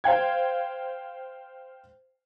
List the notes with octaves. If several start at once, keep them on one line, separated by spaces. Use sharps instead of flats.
C5 F5 G5 G#6